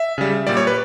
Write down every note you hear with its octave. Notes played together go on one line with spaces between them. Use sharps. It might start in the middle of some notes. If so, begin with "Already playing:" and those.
Already playing: E5
C#3 G3
A#2 G3 D5
C#5
B4